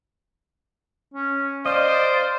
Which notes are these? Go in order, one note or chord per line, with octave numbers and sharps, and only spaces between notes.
C#4
C5 D5 D#5 F5